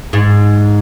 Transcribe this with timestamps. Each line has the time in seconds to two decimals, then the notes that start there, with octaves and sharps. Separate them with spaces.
0.13 G#2